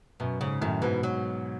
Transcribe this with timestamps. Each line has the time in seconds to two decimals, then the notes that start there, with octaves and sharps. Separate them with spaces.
0.20 F#2 B2
0.40 G#2 C#3
0.61 F#2 A2 D#3
0.82 G#2 B2 E3
1.03 F#3